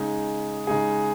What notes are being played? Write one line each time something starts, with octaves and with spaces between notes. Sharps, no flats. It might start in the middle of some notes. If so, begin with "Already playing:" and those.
Already playing: C#3 G#3 D#4 G#4
C#3 G#3 D#4 G#4